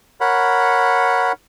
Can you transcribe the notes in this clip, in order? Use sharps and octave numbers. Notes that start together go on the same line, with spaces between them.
A#4 C#5 F#5 B5